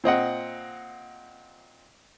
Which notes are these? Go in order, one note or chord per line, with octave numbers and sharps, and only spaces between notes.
A#2 C4 D#5 F#5